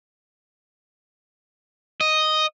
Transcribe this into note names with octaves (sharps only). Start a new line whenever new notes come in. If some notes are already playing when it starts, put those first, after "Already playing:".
D#5